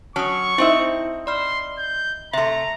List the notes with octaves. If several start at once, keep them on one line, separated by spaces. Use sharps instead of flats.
F#3 C#4 A5 C#6 D#6
C4 D#4 E4 C5 E5
D5 B5 C6 F6
G6
C3 A3 E5 A#5 C6